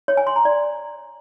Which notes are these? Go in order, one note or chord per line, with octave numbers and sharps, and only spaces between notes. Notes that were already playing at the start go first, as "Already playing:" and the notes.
C#5
G#5
C6
A#5
D5